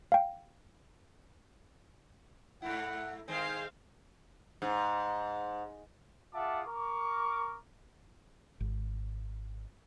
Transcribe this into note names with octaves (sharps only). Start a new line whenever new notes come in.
F5 G5
G#2 A3 E4 F#5
D#3 G#3 C4 C5 F5 G#5
G#2
F4 G#4 E5 F#5 A5 D6
A#4 C#6 D6
G#1